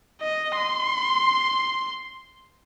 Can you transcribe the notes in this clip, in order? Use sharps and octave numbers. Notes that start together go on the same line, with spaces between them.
D#5
C6